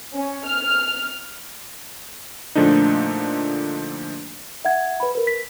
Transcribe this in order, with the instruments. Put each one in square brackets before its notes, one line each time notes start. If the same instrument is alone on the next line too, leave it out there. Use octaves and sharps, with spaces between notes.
[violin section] C#4
F6
[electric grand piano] A#2 D3 F3 A3 D4 D#4
[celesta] E5 F#5 G#6
B4 B5
A#4 B4
B6